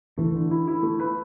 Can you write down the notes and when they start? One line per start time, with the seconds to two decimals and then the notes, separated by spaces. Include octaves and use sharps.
0.17 E3 A3
0.34 D3
0.51 E4
0.67 E4
0.83 A3
1.00 B4